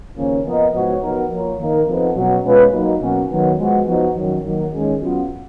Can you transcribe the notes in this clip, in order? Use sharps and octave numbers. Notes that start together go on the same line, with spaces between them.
D#2 C#3 F3 A#3 C#4
F3 B3 F4 A#4 D#5
G#2 F3 B3 F#4 C#5
F3 B3 D#4 F#4 A#4
F3 A#3 F4 A#4 C#5
D#3 A#3 D#4 A#4
F2 F3 B3 D#4
B2 F#3 C#4 F#4
B2 G#3 C#4 F4 B4
F#3 A#3 D#4
B2 F#3 A#3 C#4 F#4
D#3 F#3 B3
F3 G#3 B3 F#4
F3 B3 D#4 F#4
F#2 D#3 F#3
D#3 F#3 A#3
D#3 G#3 C#4 G#4
C#3 F#3 B3 F4